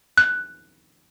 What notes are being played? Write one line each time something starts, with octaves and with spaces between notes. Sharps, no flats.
F#6